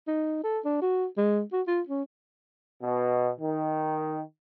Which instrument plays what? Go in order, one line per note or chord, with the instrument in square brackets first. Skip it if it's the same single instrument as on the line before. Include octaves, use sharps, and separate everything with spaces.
[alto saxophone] D#4
A4
D4
F#4
G#3
F#4
F4
C#4
[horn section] B2
D#3